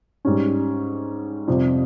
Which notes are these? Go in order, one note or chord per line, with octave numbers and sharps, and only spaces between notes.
G#2 G3 C#4
F2 C3 G3 C4